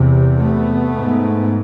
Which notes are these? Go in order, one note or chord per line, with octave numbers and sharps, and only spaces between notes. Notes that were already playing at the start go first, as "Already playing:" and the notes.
Already playing: E2 C3
A3 B3
G#2